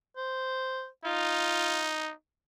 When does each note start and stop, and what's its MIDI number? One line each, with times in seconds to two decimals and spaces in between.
0.17 0.87 72
1.05 2.12 63
1.05 1.92 65